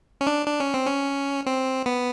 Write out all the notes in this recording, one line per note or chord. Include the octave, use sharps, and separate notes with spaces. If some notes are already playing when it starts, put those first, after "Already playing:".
C#4
D4
D4
C#4
C4
C#4
C4
B3